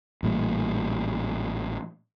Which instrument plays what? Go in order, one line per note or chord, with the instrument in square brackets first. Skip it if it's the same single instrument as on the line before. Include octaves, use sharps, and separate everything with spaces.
[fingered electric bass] A1 A#2 G3